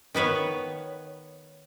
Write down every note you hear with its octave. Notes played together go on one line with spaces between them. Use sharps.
D#3 B3 B4 C#5